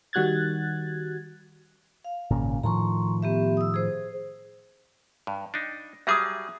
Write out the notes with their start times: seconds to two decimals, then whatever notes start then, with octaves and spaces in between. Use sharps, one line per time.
0.13 D#3 G3 F#4 F#6 G#6 A6
2.04 F5
2.31 G#1 A#2 C#3
2.63 A2 D#3 F3 A#5 C6 C#6
3.22 B3 G4 E5
3.57 D#6 E6
3.74 G#4 C5
5.27 G2
5.54 D4 D#4
6.07 F#3 G3 G#4 E5 D6 D#6